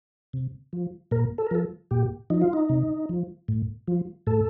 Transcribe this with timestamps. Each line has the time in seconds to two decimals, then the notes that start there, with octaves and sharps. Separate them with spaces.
0.33 C3
0.73 F3
1.11 A#2 A#4
1.38 A4
1.47 A#4
1.51 F3 A4
1.91 A#2 G4
2.30 F3 D#4
2.42 F4
2.53 D#4
2.69 C3
3.09 F3
3.48 A2
3.88 F3
4.27 A2 A4